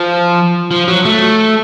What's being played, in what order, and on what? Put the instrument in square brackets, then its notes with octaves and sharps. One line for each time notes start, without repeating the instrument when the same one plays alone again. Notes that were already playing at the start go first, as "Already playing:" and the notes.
Already playing: [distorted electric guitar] F3
F3
F#3
A3